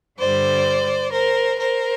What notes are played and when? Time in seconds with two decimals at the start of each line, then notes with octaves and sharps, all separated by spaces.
0.19 G2 D3 G3 C5 D5
1.12 A#4 C5
1.59 A#4 C5